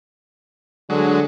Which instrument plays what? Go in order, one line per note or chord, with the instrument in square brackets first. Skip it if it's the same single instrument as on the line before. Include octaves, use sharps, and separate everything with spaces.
[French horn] D3 [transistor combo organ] F#3 G#3